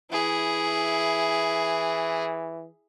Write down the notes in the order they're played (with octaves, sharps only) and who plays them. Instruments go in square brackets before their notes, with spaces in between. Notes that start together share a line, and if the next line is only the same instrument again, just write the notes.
[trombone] E3 [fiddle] E4 G#4